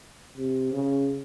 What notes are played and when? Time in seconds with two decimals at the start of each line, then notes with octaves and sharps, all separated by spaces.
0.38 C3
0.73 C#3